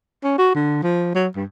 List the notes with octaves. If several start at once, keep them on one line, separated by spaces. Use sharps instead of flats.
C#4
F#4
D3
F3
F#3
G2